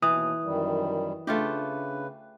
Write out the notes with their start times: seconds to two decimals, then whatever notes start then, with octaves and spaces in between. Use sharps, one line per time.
0.02 D#2 B2 E3 B4 D#6
0.43 F#2 D#3 G3
1.27 C#3 A3 D4 F4 G4 B4